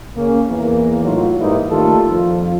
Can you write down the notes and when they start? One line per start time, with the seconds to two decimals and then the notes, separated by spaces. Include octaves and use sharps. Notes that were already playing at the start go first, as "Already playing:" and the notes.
0.16 C#3 A#3 C#4
0.48 E2 E3 A#3
1.03 A2 F#3 D#4 F4
1.38 G#2 E3 G3 A#3 D#4 E4
1.70 D#3 G3 A3 A#3 F4 A4
2.10 F2 F4